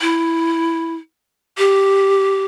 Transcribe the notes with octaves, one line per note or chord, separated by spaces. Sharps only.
E4
G4